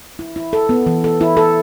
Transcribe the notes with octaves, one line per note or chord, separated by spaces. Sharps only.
E4
E4
A4
B3
E3
A4
E4
A4